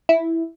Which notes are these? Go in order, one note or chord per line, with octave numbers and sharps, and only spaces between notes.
E4